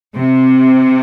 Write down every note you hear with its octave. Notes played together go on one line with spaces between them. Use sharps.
C3